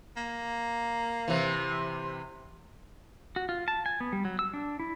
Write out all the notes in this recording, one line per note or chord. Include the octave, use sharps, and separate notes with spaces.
A#3
C3 E3
F#4
F4
A5
G#5
B3
G3
F#3
E6
D4
E4